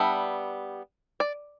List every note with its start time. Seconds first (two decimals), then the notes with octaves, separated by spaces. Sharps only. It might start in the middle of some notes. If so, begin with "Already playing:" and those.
Already playing: G3 B3 D4 E5
1.20 D5